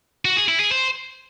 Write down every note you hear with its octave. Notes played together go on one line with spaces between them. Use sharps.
F#4
G#4
E4
G#4
C5